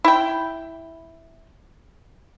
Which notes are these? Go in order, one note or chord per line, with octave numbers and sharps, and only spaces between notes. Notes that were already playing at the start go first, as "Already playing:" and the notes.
E4 G5